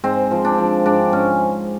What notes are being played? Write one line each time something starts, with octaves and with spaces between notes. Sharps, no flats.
G#2 C4
F3
D4
F3
G#2 D4
G#2 C#4